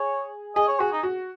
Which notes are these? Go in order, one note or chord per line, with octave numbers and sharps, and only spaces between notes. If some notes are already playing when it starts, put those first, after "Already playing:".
Already playing: G#4 C#5
G#4 D#5
C#5
F#4 G#4
D#4
F#4